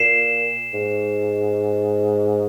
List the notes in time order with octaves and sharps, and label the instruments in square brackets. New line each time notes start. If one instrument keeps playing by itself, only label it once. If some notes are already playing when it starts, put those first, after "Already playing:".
Already playing: [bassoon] A#2 [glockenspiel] C7 E7
[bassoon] G#2